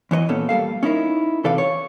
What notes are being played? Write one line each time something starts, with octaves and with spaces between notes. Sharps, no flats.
E2 E3 C#5 D#5
A#2 B3 C#4 A4
G3 A#3 A4 F5
C#4 D#4 E4 A#4
C3 E3 A4 B4 D5 F5
C#5